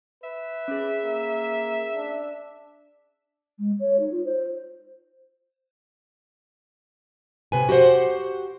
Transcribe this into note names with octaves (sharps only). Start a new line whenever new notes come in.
B4 E5
C#4 G#4
A#3
D4
G#3
C#5
D#4
F4
C5
C3 B4 G#5
F#4 G4 A#4 C5 F#5